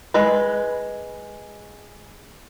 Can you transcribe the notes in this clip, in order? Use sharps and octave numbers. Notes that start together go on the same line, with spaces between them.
G#3 B4